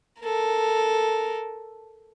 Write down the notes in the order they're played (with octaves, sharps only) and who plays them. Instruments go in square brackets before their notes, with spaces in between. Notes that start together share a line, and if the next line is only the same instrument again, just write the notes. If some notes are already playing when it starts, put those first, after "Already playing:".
[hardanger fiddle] A4 A#4